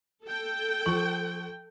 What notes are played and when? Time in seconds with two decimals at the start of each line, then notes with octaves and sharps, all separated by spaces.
0.25 A4 G5
0.86 F3 C#6 F#7